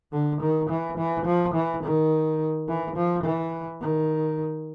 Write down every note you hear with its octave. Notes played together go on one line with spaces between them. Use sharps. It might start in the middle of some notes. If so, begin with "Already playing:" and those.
D3
D#3
E3
E3
F3
E3
D#3
E3
F3
E3
D#3